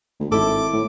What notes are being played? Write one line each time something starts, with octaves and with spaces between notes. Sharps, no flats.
D2
G#1 E4 A4 D6
A2